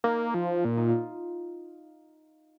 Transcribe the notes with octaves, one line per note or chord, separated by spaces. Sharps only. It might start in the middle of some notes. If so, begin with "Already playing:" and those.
A#3 D#4
F3 F4
A#2 F4
D#4
F4